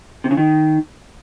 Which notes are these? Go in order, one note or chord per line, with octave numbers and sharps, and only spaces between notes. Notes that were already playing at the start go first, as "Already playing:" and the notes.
C3
C#3
D#3